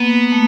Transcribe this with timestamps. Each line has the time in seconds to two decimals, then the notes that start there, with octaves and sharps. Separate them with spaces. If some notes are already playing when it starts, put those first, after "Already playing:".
Already playing: A#3 B3
0.32 A3